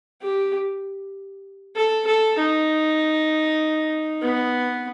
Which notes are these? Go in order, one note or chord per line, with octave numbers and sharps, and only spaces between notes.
G4
A4
A4
D#4
B3